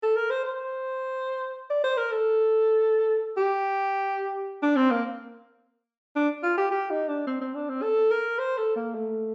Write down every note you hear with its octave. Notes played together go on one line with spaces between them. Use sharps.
A4
A#4
C5
C5
D5
C5
A#4
A4
G4
D4
C4
A#3
D4
F4
G4
G4
D#4
D4
C4
C4
D4
C4
A4
A#4
C5
A4
A#3
A3